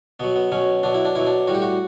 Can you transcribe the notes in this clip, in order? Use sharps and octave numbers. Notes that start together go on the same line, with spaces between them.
B2 F#3 B3
B3
B2 F#3 C#4
B2 F#3 D4
E4
D4
B2 F#3 E4
D4
A2 G3 F#4
G4
F#4